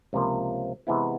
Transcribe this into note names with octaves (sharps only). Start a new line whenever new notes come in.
C#2 C3 F3 A#3
C3 E3 G#3 B3 E4